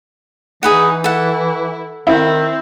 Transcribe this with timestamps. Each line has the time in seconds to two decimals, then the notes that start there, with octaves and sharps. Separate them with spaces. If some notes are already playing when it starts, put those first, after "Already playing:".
0.63 E3 D#4 G#4 B4 F#5
1.04 E4 A4 F#5
2.07 D#3 C4 E4